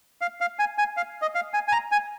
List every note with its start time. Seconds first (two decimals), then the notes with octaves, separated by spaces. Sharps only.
0.21 F5
0.41 F5
0.59 G#5
0.78 G#5
0.97 F5
1.22 D#5
1.35 F5
1.54 G#5
1.68 G#5
1.72 A#5
1.92 G#5